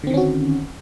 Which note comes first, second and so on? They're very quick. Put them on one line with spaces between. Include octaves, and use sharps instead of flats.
D3 C4 D#3 C#4 F#4